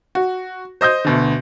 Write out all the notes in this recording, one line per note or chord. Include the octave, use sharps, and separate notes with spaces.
F#4
C5 D#5 D#6 G6
D2 B2 D3